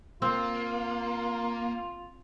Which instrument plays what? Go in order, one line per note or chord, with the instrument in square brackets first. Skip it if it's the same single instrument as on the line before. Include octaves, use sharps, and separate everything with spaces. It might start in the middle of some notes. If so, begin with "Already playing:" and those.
[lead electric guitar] A#3 [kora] C4 [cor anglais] F4